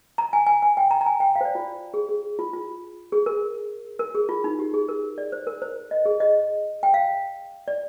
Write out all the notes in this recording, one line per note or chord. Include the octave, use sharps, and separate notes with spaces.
A#5
G#5
G#5
G#5
G5
A#5
A#5
G#5
G5
F5
C5
D5
F4
G#4
G#4
F4
F4
G#4
A#4
A#4
G#4
F4
D#4
G4
G#4
A#4
D5
C5
A#4
C5
D#5
G#4
D#5
G5
F5
D5